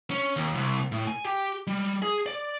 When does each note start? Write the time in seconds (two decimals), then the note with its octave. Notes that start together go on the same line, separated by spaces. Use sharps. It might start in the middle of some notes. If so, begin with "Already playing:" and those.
0.11 C#4
0.36 D#2
0.55 C2
0.92 A2
1.07 G#5
1.24 G4
1.67 G3
2.02 G#4
2.26 D5